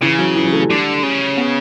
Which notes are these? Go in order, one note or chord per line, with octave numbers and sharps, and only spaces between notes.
C#3 E3
F#3
E3
F#3
A3
G3
D3
C#3
B3